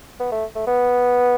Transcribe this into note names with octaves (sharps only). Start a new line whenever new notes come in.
B3
A3
A3
B3